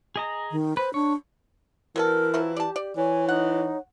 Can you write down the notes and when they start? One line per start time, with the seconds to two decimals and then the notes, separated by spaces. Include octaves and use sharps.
0.16 G#4 D#5 A#5
0.52 D#3
0.77 B4 C5
0.94 D4 C#5
1.96 E3 F#3 B3 A4 A#4
2.34 F3 F#3 E4
2.57 G4 D5 A5
2.76 D5
2.97 E3 C#5 G#5
3.29 D#4 F#5